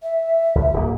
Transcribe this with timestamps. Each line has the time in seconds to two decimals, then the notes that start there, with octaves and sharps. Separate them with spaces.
0.03 E5
0.55 C#2
0.73 D1 A#3